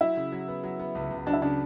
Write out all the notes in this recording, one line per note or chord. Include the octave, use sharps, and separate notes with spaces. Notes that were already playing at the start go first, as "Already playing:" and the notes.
F#3 E4
C#3
F#3
B3
F#3
B3
C#2
C#2
F#3 D4
E4
C#3 D4